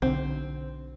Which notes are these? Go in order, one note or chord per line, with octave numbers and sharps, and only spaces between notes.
B1 D3 C4